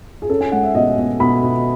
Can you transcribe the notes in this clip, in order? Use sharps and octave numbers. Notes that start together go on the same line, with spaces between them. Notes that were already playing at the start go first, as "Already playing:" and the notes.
G#4
C#4 A4
G#5
G#3 F#5
E5
B2 D#5
B2
B2 B5
B2